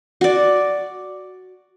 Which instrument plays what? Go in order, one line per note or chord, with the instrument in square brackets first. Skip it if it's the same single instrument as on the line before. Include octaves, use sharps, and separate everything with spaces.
[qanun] F#4 D5